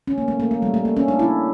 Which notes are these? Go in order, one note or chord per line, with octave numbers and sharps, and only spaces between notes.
C#4
A#3
A3
A#3
A3
G3
A3
A#3
C#4
D4
E4